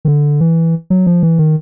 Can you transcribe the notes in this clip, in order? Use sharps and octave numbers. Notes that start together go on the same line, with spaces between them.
D#3
D3
E3
F#3
F3
E3
D#3